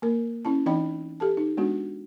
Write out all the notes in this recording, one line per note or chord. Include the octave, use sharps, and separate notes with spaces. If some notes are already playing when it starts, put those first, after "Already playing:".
A#3 A#4
C#4 E4 A5
E3 C4 D#4 D#5 G5 B5
G4 A4 A5
D#4
G#3 B3 D4 F#4